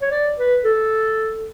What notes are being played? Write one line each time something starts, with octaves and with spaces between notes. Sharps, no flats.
C#5
D5
B4
A4